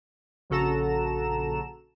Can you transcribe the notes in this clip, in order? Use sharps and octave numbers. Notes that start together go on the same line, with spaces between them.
A#1 C#3 F#4 A4 A#5 E7